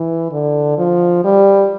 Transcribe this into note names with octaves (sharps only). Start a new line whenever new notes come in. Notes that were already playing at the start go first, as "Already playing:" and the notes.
Already playing: E3
D3
F3
G3